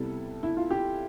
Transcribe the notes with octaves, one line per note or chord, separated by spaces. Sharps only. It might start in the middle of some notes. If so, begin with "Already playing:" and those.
Already playing: C3 G3 B3 E4 A4
E4
F4
G4